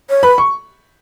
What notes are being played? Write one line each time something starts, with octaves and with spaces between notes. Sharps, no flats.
C#5
B4 B5
C#6